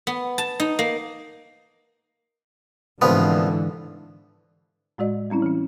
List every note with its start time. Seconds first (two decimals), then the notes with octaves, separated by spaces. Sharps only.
0.07 B3
0.38 A5
0.60 D#4
0.79 A#3
3.02 C2 G#2 D3 E3 F3 B3
4.98 A2 G#3 F#4 D5 D#5
5.30 G3 C4 C#4 E4
5.42 E3 C#4